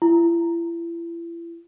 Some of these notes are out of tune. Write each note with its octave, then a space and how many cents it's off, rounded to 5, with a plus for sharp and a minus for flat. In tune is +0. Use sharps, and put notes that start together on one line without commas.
E4 +40